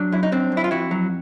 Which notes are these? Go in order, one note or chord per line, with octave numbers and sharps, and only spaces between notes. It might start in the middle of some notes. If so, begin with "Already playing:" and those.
Already playing: F#3 D4
F#2 E4
D#4
F#2 C4 D4
F#2
E4
F4
F2 E4 F#4
F#3